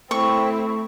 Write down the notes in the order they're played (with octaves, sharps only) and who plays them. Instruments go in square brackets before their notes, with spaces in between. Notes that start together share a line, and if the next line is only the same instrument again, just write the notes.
[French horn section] A3 [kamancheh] C4 E4 [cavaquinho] C#6